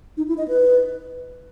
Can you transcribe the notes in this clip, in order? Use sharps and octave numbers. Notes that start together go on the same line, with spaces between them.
D#4
E4
D#5
B4